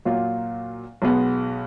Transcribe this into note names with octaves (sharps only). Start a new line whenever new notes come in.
A#2 F#3 A#3 F4
B1 B2 G#3 B3